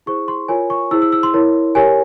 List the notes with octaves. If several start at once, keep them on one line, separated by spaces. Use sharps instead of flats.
E4 G#4 C5 C#6
C6
F4 A#4 C#5 G#5
C#6
E4 G#4 C5 E6
E6
E6
C6
E4 A#4 C#5
G4 A#4 C#5 G#5